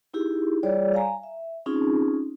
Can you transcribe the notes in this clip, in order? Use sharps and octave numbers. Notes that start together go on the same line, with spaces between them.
D#4 E4 G4 G#4
G3 F4 G#4 C#5 D5
F5 G#5 A#5
E5
C4 C#4 D#4 F4 G#4